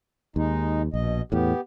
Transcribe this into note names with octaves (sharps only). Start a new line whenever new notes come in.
D#2 G#3 D#4
A#1 B2 D#5
E2 A2 B3 G4